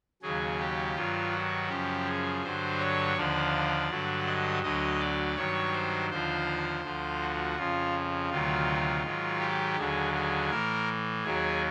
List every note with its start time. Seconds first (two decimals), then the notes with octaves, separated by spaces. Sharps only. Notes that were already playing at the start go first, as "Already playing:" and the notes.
0.22 D#2 C#3 F#3 G#4
0.59 G4
0.96 G2 D#3 F#3 F4
1.33 F#4
1.69 F#2 C#3 F3 G4
2.06 G#4
2.42 G2 D3 F#3 C5
2.79 C#5
3.16 D#2 D3 F3 D5
3.90 G2 D3 F#3
4.26 D#5
4.63 D2 D3 F#3 D#5
4.99 D5
5.36 G2 D#3 F#3 C#5
5.73 C5
6.10 D#2 D3 F3 C5
6.83 D2 D3 F3
7.20 F#4
7.57 F2 C#3 F3 F4
8.30 D2 C3 D#3 F#3 F4
9.03 G#2 D#3 F#3
9.39 G4
9.77 D#2 D3 F#3 G#4
10.14 G#4
10.50 A2 E3 A#4
11.23 D#2 D#3 F#3 G#4